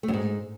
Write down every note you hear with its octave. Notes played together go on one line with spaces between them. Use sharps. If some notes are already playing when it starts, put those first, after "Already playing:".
A3
F#2
G#2